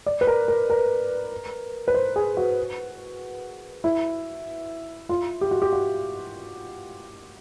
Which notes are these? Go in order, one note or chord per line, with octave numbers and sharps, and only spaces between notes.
D5
B4
A#4
A#4
A#4
B4
C5
G#4
F#4
E4
F4
G4
F#4
G4
F#4